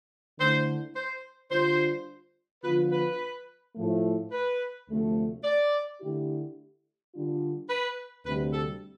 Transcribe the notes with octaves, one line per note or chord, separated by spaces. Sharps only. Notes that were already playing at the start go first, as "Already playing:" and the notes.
D3 A3 E4 C5
C5
D3 G3 D4 F4 C5
D3 F3 B3 F4 B4
B4
A2 F3 A3
B4
D2 C3 F3 A3
D5
D3 A3 E4 G4
D3 G3 D4 F4
B4
D2 C3 G3 B4
A4